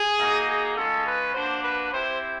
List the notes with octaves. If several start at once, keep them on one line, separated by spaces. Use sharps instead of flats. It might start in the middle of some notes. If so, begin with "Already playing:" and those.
Already playing: G#4
A#3 D#4 F#4
G#4
G#3 C#4 F4 A4
B4
A#3 D4 F#4 C5
B4
C4 E4 G4 C5